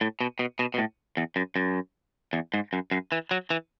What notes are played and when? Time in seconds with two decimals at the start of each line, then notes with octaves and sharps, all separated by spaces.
0.01 A2
0.21 B2
0.39 B2
0.59 B2
0.74 B2
0.78 A2
1.17 E2
1.36 F#2
1.56 F#2
2.33 E2
2.54 G#2
2.73 F#2
2.91 F#2
3.12 E3
3.31 F#3
3.50 E3